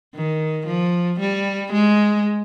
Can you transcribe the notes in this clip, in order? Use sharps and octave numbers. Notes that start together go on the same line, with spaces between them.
D#3
F3
G3
G#3